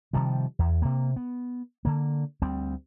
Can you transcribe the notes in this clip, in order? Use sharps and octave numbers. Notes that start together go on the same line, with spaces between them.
C3 D#3 F3 G3
E2
C3 A#3
B3
D3 A#3
D2 G3 C4